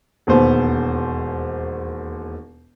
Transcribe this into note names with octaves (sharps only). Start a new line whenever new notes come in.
E1 D#2 B3 C5